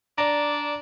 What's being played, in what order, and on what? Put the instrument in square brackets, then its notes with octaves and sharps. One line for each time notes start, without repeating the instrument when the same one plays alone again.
[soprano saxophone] D4 [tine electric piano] D5 A#5